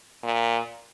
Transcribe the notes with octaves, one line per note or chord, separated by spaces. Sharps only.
A#2